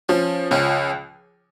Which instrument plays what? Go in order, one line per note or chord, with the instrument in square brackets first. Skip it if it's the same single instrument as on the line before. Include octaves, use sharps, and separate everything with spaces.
[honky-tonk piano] F3 [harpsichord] C#4
[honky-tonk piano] C#2 [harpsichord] C#4